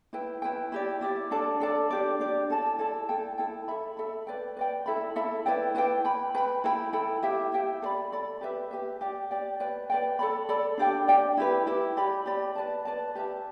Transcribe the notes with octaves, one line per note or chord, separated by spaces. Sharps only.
E4 B4 G5
E4 B4 G5
E4 G4 D5
E4 G4 D5
D4 A4 D5 A5
D4 A4 D5 A5
D4 G4 D5
D4 G4 D5
E4 A4 D5 A5
E4 A4 D5 A5
E4 A4 G5
E4 A4 G5
A4 E5 B5
A4 E5 B5
B4 D5 G5
B4 D5 G5
E4 A4 E5 B5
E4 A4 E5 B5
E4 B4 D5 G5
E4 B4 D5 G5
B4 G5 B5
B4 G5 B5
E4 A4 G5 B5
E4 A4 G5 B5
E4 G4 E5 G5
E4 G4 E5 G5
A4 D5 B5
A4 D5 B5
G4 B4 E5
G4 B4 E5
G4 D5 G5
G4 D5 G5
B4 D5 G5
B4 D5 G5
A4 D5 B5
A4 D5 B5
D4 G4 D5 G5
D4 G4 D5 G5
E4 G4 B4
E4 G4 B4
G4 D5 B5
G4 D5 B5
B4 D5 A5
B4 D5 A5
G4 B4 E5 A5